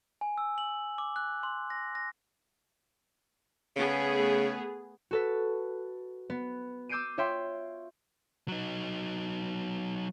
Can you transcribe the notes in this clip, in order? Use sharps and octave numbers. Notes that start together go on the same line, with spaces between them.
G#5
E6
F#7
D6
F#6
C6
A#6
A#6
C#3 A3 B3 G#4
F#4 A4 B4
B3
D6 E6 G6 C7 D7 D#7
F4 C#5 E5 G5 C6
F#3 D#4